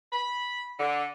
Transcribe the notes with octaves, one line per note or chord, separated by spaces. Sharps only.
B5
D3